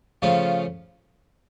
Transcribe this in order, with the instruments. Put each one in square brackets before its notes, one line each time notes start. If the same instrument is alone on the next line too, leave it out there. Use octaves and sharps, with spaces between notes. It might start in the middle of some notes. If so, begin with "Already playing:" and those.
[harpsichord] C#3 F3 A3 C#4 F4